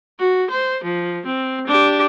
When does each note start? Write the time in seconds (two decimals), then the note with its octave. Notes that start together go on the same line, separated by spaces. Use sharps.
0.19 F#4
0.50 C5
0.84 F3
1.26 C4
1.67 D4 G4